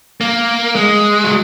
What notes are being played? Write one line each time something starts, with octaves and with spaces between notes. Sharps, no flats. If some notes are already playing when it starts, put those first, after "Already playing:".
A#3
G#3
F#3